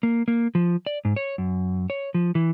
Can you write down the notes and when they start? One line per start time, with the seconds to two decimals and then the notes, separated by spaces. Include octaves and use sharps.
0.03 A#3
0.28 A#3
0.55 F3
0.86 D5
1.05 G#2
1.16 C#5
1.38 F#2
1.90 C#5
2.14 F3
2.35 E3